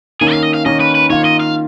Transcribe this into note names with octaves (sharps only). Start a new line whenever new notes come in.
D#3 A#3 C#4 G#4
F5
D#5
F5
D#3 A#3 C#4 D#5
B4
B4
D#3 A#3 F4 C#5
D#5
F5